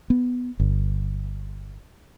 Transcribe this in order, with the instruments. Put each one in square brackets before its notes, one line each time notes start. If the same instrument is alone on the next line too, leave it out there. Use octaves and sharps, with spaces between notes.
[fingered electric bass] B3
G1